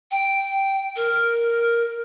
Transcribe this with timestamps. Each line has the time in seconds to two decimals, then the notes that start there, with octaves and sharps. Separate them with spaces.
0.11 G5
0.96 A#4